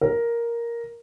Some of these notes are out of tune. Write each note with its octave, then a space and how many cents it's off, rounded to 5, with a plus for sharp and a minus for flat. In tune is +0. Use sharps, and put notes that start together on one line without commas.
A#4 +5